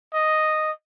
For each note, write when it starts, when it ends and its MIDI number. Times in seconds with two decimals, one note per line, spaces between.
0.14 0.72 75